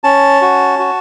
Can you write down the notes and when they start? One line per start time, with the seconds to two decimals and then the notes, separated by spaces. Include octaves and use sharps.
0.04 C#4 A5
0.42 F#4
0.79 F#4